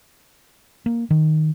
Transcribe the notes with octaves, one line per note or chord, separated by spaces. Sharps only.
A#3
D#3